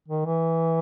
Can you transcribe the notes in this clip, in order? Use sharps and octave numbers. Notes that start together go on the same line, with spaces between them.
D#3
E3